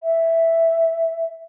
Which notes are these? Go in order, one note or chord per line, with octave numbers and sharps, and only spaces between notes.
E5